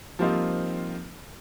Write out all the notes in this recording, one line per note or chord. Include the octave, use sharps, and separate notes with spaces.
F3 G3 A#3 C4 D#4 F4